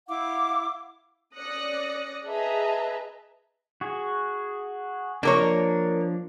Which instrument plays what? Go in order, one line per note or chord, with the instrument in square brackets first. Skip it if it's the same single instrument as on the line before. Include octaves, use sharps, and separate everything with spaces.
[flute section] E4 F5 F#5 D6
[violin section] C#4 D5 D#6 F#6 A#6 C#7
G#4 B4 D#5 E5 A5 A#5
[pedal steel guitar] F#4 G#4
[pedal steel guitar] F3 D4 [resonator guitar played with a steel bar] A#3 A#4 C#5